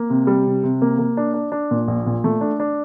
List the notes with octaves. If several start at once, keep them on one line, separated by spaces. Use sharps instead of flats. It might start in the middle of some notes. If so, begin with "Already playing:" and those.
Already playing: A#3
C3
G3
C3
C3
A#3
A#3
D4
D4
D4
A#2
A#1
A#2
A3
D4
D4